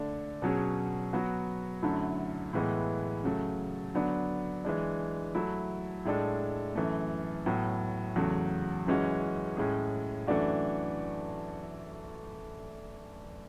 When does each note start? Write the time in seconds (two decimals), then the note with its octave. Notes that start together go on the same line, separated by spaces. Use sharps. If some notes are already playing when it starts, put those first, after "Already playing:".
Already playing: D3 A3 D4
0.42 B2 F#3 C#4 G#4
1.13 F#3 B3 F#4
1.83 F#2 D3 F#3 A3 E4
2.53 A2 E3 G#3 B3
3.24 C#3 F#3 A3
3.94 D3 F#3 B3 D4
4.65 E3 G#3 D4
5.35 F#3 A3 E4
6.05 A2 G#3 D4 A4
6.75 F#2 E3 A3
7.46 A2 F#3 B3
8.16 E2 C#3 F#3 A3
8.87 F#2 E3 G#3 C#4 F#4
9.57 A2 G#3 C#4 G#4
10.27 F#2 E3 A3 D4 F#4